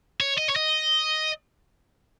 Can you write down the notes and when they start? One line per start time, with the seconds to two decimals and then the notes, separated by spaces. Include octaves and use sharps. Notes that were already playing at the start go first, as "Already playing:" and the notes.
0.20 C#5
0.38 D#5
0.50 C#5
0.56 D#5